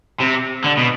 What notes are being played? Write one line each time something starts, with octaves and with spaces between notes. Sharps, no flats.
C3
D3
B2